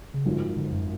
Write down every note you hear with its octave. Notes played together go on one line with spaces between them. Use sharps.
C#3
G#1 F#2 D3 F3
D3
F#2